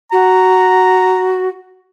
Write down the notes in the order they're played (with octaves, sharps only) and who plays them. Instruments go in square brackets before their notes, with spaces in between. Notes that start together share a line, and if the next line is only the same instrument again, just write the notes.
[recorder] F#4 [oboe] A#5